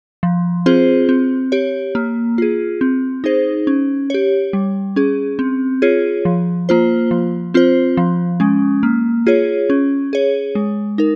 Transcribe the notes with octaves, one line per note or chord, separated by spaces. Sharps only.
F3
C4 F4 G#4 C5
C4
G4 C#5
A#3
F4 G#4
C4
D#4 G#4 C5
C#4
G4 C#5
G3
C#4 G#4
C4
F4 G#4 C#5
F3
A#3 F4 C5
F3
C4 F4 C5
F3
G#3 C#4
A#3
F4 G#4 C#5
C#4
G#4 C#5
G#3
D#4 A#4